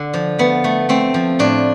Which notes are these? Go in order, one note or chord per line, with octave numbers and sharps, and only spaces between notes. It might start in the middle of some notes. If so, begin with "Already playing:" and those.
Already playing: D3 D4
F3
A3 B3
A3
A3 C4
F3
A2 D4